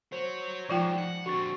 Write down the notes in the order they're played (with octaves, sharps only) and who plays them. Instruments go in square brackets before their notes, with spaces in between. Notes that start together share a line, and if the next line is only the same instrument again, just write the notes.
[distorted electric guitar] F#4 C#5 [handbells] C5
[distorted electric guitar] G#2 [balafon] F3 F4 G5
[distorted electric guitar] F#5
[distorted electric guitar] D3 C4 [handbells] F#4 C#6 A6